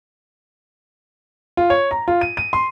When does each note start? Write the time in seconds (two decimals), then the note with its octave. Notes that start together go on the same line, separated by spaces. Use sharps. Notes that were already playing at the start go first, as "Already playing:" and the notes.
1.57 F4
1.70 C#5
1.91 A#5
2.08 F4
2.21 D#7
2.37 D#7
2.53 C6